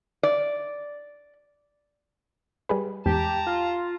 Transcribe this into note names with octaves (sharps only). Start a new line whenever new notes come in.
D5
G3 G#4 B4
E2 G#2 G4 A5 A#5
F4